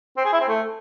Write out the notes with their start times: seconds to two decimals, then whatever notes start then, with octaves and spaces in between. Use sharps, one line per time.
0.17 C4
0.25 G#4
0.33 E4
0.41 C4
0.48 A3